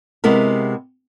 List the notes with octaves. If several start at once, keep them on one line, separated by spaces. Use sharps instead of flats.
C3 G#3 B3 E4 A#4